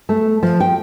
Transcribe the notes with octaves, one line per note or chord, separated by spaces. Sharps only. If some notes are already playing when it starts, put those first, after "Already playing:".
A3
F3
G5